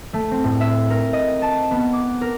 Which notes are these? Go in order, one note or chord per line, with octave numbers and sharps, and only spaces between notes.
A3
C4
A2
E5
A#4
D#5
A5
B3
D6
A#4